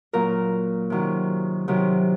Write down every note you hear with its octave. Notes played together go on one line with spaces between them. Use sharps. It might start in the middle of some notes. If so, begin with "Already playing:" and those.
A#2 F#3 A#4
C3 D#3 F#3
C3 D#3 F#3